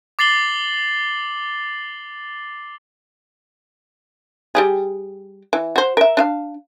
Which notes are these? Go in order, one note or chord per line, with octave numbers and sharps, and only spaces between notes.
D6 A6 C7 F#7 G7
G3 G4 G#4
E3
F#4 C5
A#4 E5
D4 E5 F5